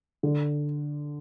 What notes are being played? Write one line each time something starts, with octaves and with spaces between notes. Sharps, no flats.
D3